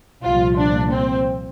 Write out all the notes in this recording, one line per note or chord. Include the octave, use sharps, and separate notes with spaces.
C2 A#2 F3 F4
D4
C4